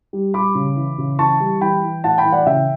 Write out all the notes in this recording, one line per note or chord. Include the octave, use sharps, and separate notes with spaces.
G3
G3 B5 D6
C#3
E3
C#3
E3 A5 C#6
G3
E3 G5 B5
E3
A2 F#5 A5
G5 B5
E3
D5 F#5
C#3 E5 G5